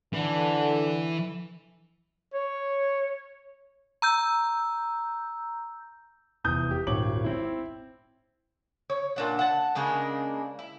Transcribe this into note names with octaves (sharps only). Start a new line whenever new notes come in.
D3 E3
C#5
A#5 E6 G6
F1 E2 D#6 G6
G4
D#1 G#1 C#5 D6 F#7
C4 E4
C#5
A#2 D4 F#5
F#5 A5
C#3 G#3 A#3 D4
E4